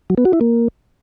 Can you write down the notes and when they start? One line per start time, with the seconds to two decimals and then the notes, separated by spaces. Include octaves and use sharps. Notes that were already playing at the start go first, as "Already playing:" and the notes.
0.10 F#3
0.18 B3
0.25 F#4
0.33 E4
0.41 A#3